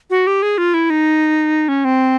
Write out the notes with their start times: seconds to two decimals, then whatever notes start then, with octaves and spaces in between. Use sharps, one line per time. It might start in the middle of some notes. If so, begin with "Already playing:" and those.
0.10 F#4
0.27 G4
0.42 G#4
0.58 F4
0.74 E4
0.90 D#4
1.69 C#4
1.85 C4